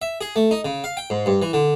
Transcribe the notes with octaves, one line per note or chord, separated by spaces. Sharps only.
E5
G#4
A3
D#4
C#3
F5
G5
G#2
G2
E3
D3